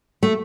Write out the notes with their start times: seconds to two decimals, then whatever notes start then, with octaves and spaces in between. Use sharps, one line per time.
0.23 A3